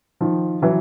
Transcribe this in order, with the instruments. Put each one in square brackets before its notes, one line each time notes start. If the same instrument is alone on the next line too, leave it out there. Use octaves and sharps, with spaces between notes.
[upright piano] D#3 F3
E3 F#3